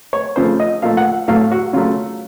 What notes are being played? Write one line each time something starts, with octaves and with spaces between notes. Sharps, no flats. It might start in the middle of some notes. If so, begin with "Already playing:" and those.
C#5
C#3 F3 A3 C5
D#5
A#2 F3 A3 F5
F#5
A2 F#3 A3 F5
F#4
C#3 F#3 A3 F4